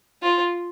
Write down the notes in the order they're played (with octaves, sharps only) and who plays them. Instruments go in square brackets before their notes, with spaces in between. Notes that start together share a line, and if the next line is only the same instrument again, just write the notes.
[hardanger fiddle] F4